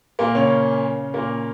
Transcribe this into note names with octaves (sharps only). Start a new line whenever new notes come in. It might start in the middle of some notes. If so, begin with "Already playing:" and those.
A#2 A#3
C#3 C#4
A#2 A#3